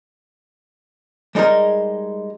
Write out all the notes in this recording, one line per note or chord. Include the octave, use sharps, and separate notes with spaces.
G3 G#3 D#4 G#4 A#4